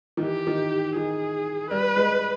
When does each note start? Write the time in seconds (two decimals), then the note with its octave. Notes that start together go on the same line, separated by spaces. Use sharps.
0.17 D#3
0.21 E3 G4
0.47 D#3
0.96 D#3 G#4
1.71 G3 B4
1.96 G#3